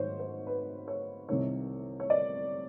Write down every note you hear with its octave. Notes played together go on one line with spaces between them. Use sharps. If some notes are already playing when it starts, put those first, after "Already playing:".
Already playing: G#1 G#2 D#3 F#3 C5 C#5
C5
B4
C#5
C2 C3 D#3 C#5
C#5
D5